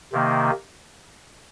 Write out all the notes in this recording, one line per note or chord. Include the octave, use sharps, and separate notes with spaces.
C3 D#3 A#3